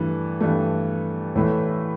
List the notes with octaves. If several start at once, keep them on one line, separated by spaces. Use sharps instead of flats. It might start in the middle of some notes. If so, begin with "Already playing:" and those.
Already playing: G2 E3 A3
G2 E3 A3
A2 E3 A3